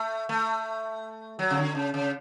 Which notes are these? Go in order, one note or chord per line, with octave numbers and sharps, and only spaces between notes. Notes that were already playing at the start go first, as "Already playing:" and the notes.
Already playing: A3
A3
F#3
C#3
D3
C#3
C#3